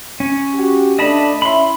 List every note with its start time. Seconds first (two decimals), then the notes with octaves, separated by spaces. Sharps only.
0.20 C#4
0.54 F#4 G4
0.99 A3 D4 D#5 A5 B5
1.42 C#4 E4 B5 C6